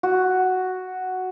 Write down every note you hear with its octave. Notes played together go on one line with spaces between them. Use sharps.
F#4